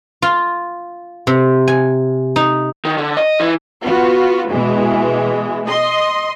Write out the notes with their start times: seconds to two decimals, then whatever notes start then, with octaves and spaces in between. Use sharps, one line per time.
0.22 F4
1.27 C3
1.68 G#5
2.36 D#4
2.85 D#3
2.98 D3
3.17 D#5
3.40 E3
3.82 B3 F4 F#4
4.49 B2 E3 G#3
5.66 D#5 C6